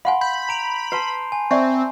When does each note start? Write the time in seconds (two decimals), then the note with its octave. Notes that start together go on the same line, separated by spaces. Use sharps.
0.05 F5 F#5 G#5 B5 C6
0.21 B5 G6
0.49 A#5 D7 F7
0.92 B4 A5 C6 C7
1.32 G#5
1.51 C4 D5 E5 C#6